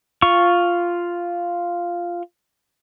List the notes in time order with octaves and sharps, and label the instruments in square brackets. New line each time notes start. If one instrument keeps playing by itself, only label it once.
[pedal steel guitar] F4 C#6